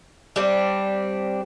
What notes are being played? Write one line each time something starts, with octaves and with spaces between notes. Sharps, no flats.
G3 C4 D4